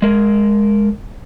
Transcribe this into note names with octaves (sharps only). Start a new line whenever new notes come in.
G#3 A#4